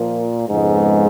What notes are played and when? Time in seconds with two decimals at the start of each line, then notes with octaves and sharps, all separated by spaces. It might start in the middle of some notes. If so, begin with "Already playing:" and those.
Already playing: A#2 F3 A#3 F4 A#4
0.49 F2 G#2 C#3 F3 G#3 B3